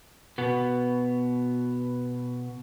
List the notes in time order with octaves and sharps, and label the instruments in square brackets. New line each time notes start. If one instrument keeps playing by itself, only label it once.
[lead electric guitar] B2 B3